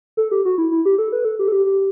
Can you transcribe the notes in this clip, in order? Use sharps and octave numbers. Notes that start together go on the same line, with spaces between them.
A4
G4
F#4
E4
E4
G4
A4
B4
A4
G4
A4
G4
G4